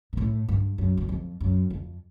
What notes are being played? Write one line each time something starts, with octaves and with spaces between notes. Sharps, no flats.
A#2
A2
G2
F#2
F#2
F2
F#2
F2